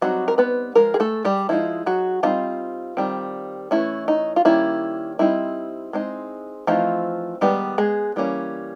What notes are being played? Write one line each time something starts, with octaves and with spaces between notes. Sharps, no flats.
F#3 G3 C4 D#4 F#4
A#4
B3 B4
F3 G#3 A#4
G#4
A3 A4
G3 G4
F3 G#3 C4 D#4 E4
F#3 F#4
F3 G3 C4 D#4 F4
D#3 G3 C4
E3 A3 C#4 E4
D#4
F4
D#3 G3 A#3 C#4 E4
G3 C4 D#4 E4
G#3 C4 D#4
E3 F3 A3 C4 D#4 F4
D#3 G3 G#3 B3 G4
G#3 G#4
E3 G3 A#3 C#4